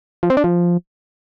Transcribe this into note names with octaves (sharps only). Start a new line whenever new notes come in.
F3
C4
D4
F3